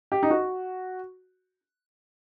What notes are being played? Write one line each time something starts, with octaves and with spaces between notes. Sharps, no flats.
G4
D#4
F#4